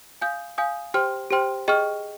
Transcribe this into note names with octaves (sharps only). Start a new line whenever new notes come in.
F5 G#5 D#6 G6
F5 G#5 D#6 G6
G4 C5 G5 C6 F6
G4 C5 G5 C6 F6
G#4 D#5 G5 C#6 F6